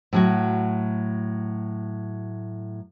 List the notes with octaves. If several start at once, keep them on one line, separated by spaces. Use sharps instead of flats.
A2 F#3 F#4